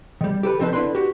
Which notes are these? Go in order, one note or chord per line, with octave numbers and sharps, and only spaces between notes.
D#3 G3
G4 A4 B4
F3 G3 C4 D#4 A4 B4
D3 E4 B4 C6
F#4 G4